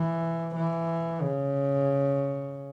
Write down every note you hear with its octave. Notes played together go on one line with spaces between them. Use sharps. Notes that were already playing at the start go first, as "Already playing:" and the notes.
Already playing: E3
E3
C#3